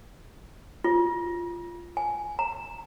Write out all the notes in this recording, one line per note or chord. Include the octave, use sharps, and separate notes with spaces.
F4
G#5
A#5